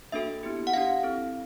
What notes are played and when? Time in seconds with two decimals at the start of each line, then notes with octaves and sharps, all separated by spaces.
0.12 A#3 D4 F#4 A4 E5
0.43 B3 E4 G4
0.67 F#5
0.73 D4 G4 F5
1.03 C4 E4 A4